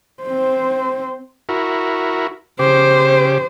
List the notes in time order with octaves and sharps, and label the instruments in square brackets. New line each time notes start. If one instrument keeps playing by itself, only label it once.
[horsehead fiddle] C4 C5
[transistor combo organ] E4 F#4 A#4
[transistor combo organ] C#3 G4 D6 [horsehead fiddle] C5